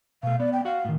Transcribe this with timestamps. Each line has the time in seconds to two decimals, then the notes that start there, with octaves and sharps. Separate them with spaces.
0.23 B2 A3 F5
0.40 B3 D5
0.53 G5
0.65 F#4 F5 F#5
0.85 A2 D#3